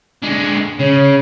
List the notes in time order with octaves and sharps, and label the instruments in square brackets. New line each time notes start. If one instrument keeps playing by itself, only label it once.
[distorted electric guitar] D3 G#3
[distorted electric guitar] C#3 [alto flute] C#5